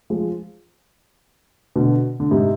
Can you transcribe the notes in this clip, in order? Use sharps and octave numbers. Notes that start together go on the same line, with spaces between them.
F3 G#3
B2 D3
D3
G#2 C3